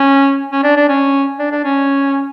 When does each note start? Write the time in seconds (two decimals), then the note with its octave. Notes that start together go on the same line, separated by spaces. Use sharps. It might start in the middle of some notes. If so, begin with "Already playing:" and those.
Already playing: C#4
0.51 C#4
0.63 D4
0.76 D4
0.89 C#4
1.39 D4
1.51 D4
1.64 C#4